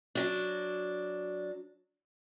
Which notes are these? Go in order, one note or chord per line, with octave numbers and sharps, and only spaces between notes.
F#3 D4